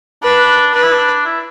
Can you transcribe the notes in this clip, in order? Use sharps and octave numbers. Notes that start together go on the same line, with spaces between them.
D4 B4
D4 B4
E4
D4
E4